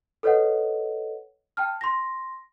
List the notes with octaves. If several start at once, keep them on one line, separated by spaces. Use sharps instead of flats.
A4 B4 C#5 D#5 F#5
G5 A5 F6
C6 A#6